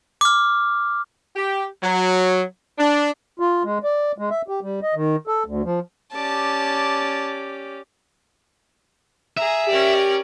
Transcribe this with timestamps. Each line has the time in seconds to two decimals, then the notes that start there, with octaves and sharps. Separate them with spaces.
0.21 D6 F6
1.36 G4
1.82 F#3
2.78 D4
3.40 F4
3.64 G#3
3.84 D5
4.18 G#3
4.30 E5
4.48 G4
4.62 G3
4.83 D#5
4.94 D#3
5.27 A4
5.46 D2
5.65 F3
6.15 C#4 G4 D5 A5 D6
9.37 G#4 E5 A#5
9.67 C#4 G4 A#4 D5